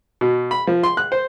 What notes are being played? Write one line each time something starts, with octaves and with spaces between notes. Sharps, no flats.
B2
B5
F3
C6
F#6
C5